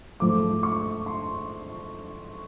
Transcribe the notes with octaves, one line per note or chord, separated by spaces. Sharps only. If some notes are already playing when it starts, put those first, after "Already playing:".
G#2 F3 A3 D6
C#6
C6